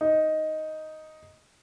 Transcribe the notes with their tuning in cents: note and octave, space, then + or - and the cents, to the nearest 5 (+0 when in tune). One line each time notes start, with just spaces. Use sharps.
D#4 +5